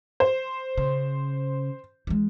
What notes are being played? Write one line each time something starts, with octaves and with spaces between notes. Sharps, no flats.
C5
C#3
E3 G#3